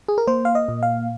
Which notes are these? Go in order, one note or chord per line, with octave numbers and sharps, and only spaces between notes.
G#4
A#4
A#3 C5
F5
D#5
A#2
F5